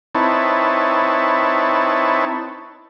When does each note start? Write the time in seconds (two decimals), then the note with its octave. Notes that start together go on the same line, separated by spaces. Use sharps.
0.15 C4 D#4 E4 B4 C#5 A5